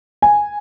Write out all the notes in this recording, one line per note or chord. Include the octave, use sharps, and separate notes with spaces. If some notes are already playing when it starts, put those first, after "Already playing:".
G#5